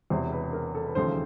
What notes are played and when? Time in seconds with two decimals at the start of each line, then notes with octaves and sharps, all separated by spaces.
0.10 E1 E2 C3 C5
0.32 B4
0.53 A#4
0.75 A4
0.86 B4
0.95 E1 D#2 C#3 F3 A3 C5